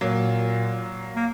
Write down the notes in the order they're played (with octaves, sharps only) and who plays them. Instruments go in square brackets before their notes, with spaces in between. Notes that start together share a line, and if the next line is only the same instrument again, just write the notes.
[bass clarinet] A#2 [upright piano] F#3 A#3
[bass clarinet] A#3